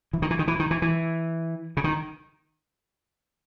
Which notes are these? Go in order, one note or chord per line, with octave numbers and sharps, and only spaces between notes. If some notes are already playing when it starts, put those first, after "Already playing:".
E3
D#3
E3
D#3
E3
D#3
E3
E3
C#3
D#3